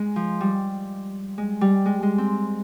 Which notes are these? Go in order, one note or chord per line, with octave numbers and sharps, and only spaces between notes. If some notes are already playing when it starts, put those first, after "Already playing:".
Already playing: G#3
F3
G3
G#3
G3
G#3
G#3
C4